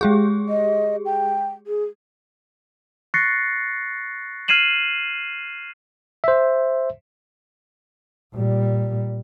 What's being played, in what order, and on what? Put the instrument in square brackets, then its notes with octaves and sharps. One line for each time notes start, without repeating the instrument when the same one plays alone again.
[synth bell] G#3 G4 G#4
[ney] D#5
G5
G#4
[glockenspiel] C#6 F#6 A6 A#6 C7 C#7
F6 G#6 C7 D#7 E7 F#7
[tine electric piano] C5 E5
[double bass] A#2 G3